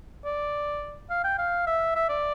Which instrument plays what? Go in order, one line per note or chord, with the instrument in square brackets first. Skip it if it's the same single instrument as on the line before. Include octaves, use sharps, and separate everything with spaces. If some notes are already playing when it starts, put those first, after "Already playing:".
[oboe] D5
F5
G5
F5
E5
E5
D5